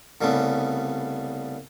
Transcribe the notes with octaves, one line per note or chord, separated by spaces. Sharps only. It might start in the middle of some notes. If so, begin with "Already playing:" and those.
C2 C#3 G3 A3 B3